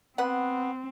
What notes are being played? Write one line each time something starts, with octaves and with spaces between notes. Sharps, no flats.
B3 C4 B4 F#5